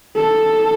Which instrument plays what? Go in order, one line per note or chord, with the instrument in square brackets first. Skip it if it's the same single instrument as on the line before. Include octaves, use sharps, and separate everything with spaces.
[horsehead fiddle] A4